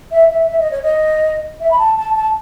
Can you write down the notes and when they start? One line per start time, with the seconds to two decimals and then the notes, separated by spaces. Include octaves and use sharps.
0.12 E5
0.30 E5
0.49 E5
0.60 D#5
0.71 C#5
0.82 D#5
1.60 E5
1.71 B5
1.79 A5
1.97 A5
2.16 A5